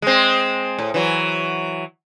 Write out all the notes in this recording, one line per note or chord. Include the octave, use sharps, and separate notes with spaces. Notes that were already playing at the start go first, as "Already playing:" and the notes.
G#3 C4
A2
E3 F#3